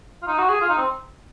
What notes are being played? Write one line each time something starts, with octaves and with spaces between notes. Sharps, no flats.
F4
D#4
F#4
G#4
F4
D#4
C4